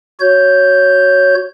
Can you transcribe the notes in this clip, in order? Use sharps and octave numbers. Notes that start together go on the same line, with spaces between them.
F#4 C#5 G6